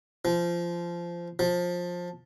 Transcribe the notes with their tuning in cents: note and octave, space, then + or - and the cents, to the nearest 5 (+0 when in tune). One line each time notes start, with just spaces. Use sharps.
F3 -15
F3 +20